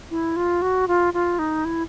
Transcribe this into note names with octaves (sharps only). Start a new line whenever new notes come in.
E4
F4
F#4
F4
F4
D#4
E4